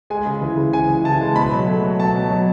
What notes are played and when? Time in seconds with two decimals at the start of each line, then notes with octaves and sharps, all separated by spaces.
0.10 G#3 G#5
0.26 C#3
0.41 E3
0.57 C#3
0.73 C#3 G#5
0.89 E3
1.04 E3 A5
1.21 G#3
1.36 B2 B5
1.52 F#3
1.67 A3
1.84 F#3
2.00 B2 A5
2.15 B2
2.30 F#3